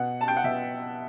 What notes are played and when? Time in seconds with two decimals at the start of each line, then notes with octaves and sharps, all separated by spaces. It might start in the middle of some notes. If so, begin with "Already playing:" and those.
Already playing: B2 F#5
0.21 A5
0.28 G5
0.36 F#5
0.44 B2 E5